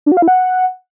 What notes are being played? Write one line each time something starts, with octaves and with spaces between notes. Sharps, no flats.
D4
F#4
F5
E4
F#5